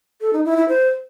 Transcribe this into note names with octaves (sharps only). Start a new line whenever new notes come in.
A4
D#4
E4
E4
C5